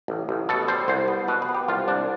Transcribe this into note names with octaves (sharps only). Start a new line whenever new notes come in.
A1
A1
B2 A4
G3 C5
C2 C5
B3
B2 B4
B4
B3
G4
C2 F4
C2 D4